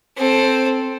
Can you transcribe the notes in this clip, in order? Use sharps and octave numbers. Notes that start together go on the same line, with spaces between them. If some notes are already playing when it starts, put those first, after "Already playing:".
C4 A4